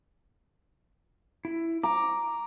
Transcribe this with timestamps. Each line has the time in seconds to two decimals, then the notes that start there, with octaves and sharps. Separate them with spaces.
1.45 E4
1.83 A#5 D6